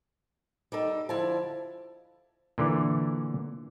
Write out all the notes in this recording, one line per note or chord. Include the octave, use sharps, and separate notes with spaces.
G3 D#4 A4
D3 F3 E4 A5
A#2 D3 E3